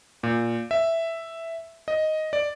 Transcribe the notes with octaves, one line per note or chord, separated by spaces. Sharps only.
A#2
E5
D#5
D5